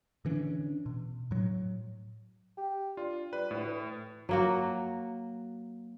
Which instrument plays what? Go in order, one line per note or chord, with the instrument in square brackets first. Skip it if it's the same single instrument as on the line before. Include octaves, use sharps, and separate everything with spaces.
[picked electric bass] D3 E3 C#4 D4
B2
A2 F#3
[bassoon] G4
[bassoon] D4 [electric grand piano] F4
[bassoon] G3 [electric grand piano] B4
[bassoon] D2 [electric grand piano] A2
[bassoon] E3
[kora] F#3 A#3 F#4